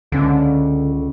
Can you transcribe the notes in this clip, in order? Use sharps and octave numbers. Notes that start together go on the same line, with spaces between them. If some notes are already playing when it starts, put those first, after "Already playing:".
C#2 D3 C#4